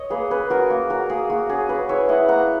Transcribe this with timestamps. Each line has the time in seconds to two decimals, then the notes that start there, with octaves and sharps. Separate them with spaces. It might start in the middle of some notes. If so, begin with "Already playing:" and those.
Already playing: C#5 D#5
0.10 A#3 G#4 B4
0.30 C#4 G#4 B4
0.50 C#4 F#4 A#4
0.70 A#3 F#4
0.90 C#4 F#4 A#4
1.09 A#3 G#4
1.30 A#3 F#4
1.49 C#4 G#4
1.69 C#4 G#4 B4
1.89 E4 C#5 E5
2.09 E4 D#5 F#5
2.29 A#3 F#5 A#5